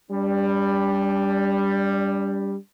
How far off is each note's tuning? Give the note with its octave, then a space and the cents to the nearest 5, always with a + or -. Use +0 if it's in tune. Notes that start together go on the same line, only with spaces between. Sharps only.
G3 +10 D4 -30